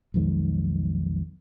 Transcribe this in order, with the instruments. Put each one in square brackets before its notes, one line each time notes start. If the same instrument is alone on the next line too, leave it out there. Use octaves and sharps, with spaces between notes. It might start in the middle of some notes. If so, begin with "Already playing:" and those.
[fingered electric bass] B1 F2 D#3 G#3